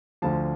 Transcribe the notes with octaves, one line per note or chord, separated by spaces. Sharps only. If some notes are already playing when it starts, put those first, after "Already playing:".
D2 D3 F3 A5